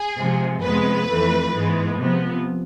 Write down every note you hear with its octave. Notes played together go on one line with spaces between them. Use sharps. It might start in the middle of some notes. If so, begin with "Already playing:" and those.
Already playing: G#4
C3 F3 G#3
F2 C3 G#3 B3 B4
F2 E3 A3
G#2 E3 G#3 B3
C3 F3 B3